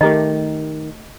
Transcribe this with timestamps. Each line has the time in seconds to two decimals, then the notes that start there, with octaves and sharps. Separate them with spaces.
0.01 D#3 A3 G4 A#4 D#5